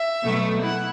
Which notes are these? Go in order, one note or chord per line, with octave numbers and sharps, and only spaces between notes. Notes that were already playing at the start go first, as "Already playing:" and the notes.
Already playing: E5
B2 F#3 A3
E4 F#5